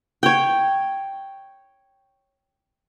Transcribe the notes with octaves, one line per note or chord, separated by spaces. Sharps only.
C#5 G5